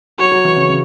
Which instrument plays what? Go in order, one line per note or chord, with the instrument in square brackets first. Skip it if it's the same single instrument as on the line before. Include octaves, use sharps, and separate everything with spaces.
[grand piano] F#3 F#4 [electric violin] C#5
[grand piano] F#3 F#4
E3 E4
C#3 C#4
C#3 C#4